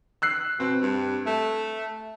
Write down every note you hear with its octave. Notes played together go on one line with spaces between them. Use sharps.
E6 F#6 C7
B2 C4
G2
A3